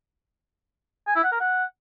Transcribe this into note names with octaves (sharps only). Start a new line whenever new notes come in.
G#5
E4
F#5
A#4
F#5